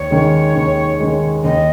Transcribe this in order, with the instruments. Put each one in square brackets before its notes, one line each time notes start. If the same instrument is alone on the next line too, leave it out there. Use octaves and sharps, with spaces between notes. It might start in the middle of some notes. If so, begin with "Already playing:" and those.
Already playing: [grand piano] D#2 [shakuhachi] C#5
[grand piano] D#3 G#3
D#2
D#3 G#3
[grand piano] D#2 [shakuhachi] D#5